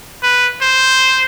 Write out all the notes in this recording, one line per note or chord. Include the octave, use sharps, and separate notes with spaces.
B4
C5